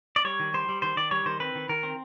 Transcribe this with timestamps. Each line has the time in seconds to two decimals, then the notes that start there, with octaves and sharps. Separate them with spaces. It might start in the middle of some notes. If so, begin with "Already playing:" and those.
0.16 D5
0.25 G3 C#5
0.40 D#3
0.54 G3 C5
0.69 G3
0.82 D#3 C5
0.97 D#3 D5
1.11 G3 C#5
1.26 D#3 C5
1.40 C4 B4
1.55 D#3
1.69 D#3 A#4
1.83 C4